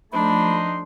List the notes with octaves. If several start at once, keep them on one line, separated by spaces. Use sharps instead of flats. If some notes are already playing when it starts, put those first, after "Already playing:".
F3 A3 D4 D#4 B5 C6